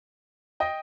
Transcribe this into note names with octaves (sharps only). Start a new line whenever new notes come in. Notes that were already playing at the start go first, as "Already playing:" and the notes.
D#5 G5